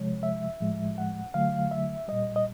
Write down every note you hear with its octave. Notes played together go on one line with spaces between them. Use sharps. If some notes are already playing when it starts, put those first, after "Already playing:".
Already playing: C3 F3 G#3 C#5
E5
A2 F3 G#3
F#5
D3 F#3 A3 F5
E5
A#2 G3 D#5
D#5